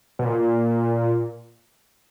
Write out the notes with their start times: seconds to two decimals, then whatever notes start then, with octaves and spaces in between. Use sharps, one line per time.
0.19 B2
0.25 A#2